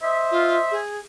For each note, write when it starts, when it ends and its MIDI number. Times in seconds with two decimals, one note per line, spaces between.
0.02 0.76 72
0.02 0.76 75
0.02 0.76 76
0.31 0.56 65
0.71 1.00 68